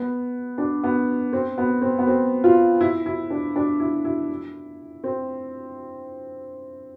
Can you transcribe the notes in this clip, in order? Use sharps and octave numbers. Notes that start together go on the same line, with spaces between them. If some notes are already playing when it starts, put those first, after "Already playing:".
Already playing: B3
D4
B3
C4
B3
C4
B3
C4
F4
E4
E4
D4
D4
E4
E4
C4